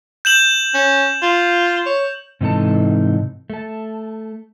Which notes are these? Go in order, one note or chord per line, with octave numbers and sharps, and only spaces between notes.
G6 E7 F#7
C#4
F4
C#5
G#2 C3 E3 D#4 A4 A5
A3 A5